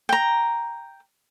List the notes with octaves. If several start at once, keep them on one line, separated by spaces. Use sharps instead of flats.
G5 A#5